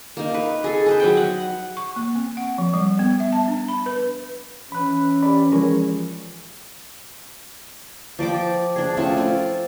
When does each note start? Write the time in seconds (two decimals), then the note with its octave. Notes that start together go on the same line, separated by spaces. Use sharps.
0.17 A#3 D#4
0.34 B4
0.64 G#4 A4
0.86 G#4 B4 C5
1.00 F#3 B4 G5
1.17 F#5
1.77 C#6
1.96 A#3
2.15 C4
2.37 F#5
2.58 F3
2.73 G3
2.99 B3
3.20 E5
3.32 A5
3.48 D4
3.68 B5
3.86 B4
4.72 E3 C#4 B5 F#6
5.23 G4 D5 B5
5.52 E3 F3 G#3 G#4 A#4 C#5
8.19 F3 D5 G5 D6
8.76 D4 G#4
8.97 A3 C4 C#4 F4
9.16 F4 D5 G#5